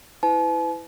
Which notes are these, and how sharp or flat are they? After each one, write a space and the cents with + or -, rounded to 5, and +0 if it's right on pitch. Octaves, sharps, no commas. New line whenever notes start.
E4 +0 B4 +35 A5 -45